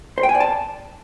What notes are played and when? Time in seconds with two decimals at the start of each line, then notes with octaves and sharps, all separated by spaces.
0.18 C5
0.23 G5
0.29 G#5
0.35 D5
0.40 A5